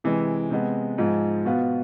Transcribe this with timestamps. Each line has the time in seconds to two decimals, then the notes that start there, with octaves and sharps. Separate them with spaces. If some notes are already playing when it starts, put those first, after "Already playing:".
0.04 C3 E3 G#3
0.50 C3 G#3 B3
0.98 G#2 F3 G#3
1.45 B2 B3 F4